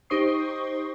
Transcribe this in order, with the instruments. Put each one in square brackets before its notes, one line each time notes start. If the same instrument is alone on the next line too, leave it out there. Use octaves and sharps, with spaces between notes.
[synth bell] D#4 G4 C5 C#6 D#6 C7